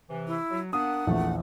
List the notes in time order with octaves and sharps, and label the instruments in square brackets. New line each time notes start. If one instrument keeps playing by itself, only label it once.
[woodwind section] C3 E3
[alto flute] E4
[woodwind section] F#3
[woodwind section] A#3 B3 D4 [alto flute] F#5 [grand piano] D#6
[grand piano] A#1 E2 [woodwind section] A3